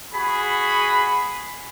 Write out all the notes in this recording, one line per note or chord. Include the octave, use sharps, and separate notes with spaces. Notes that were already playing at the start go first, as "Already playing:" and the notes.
F#4 G#4 B5